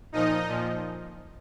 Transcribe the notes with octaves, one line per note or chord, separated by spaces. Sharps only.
A#2 F3 D#4 D#5
A#2 F3